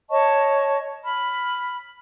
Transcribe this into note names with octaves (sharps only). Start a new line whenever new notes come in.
C#5 D#5 A5 C#6
B5 F6